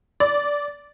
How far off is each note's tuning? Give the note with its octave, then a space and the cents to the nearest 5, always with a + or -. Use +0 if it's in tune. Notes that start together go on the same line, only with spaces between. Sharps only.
D5 -10